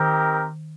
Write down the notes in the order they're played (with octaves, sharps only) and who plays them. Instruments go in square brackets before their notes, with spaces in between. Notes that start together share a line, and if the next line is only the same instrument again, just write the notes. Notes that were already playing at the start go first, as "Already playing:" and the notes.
Already playing: [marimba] D#3 [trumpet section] C4 D#4 G4 A#4